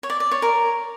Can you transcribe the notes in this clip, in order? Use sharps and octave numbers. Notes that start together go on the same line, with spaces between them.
C#5
D5
D5
C#5
A#4